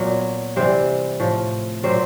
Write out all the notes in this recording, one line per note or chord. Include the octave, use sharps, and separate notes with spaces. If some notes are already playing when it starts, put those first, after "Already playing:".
Already playing: A#2 F#3 B3
C3 E3 G3 C4 C5
A2 F3
A#2 F#3 C4 C5